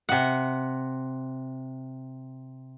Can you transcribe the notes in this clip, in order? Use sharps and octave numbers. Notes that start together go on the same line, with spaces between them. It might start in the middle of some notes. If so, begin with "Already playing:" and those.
C3 F#5